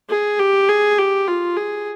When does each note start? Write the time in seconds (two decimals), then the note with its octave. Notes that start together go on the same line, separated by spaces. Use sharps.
0.10 G#4
0.39 G4
0.69 G#4
0.98 G4
1.28 F4
1.57 G#4